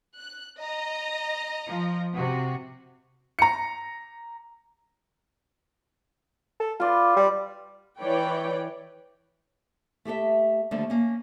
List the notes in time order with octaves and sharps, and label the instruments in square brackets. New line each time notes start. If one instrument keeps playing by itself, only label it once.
[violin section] F#6
D#5 A#5
[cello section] F3
C3 F#4
[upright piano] A#5 C#7
[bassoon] A4
[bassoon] F4 [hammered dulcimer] B4 D5 C6
[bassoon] G3
[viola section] E3 B4 C#5 D5 G5
[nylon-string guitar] A3 G4 A4 E5
D#2 D3 F3 G3 A3
A#3 C#4